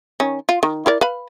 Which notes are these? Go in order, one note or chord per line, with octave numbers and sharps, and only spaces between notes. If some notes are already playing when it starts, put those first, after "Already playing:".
D#3 C#4
F4
D#3
E4 A#4 D5
B4 F5 B5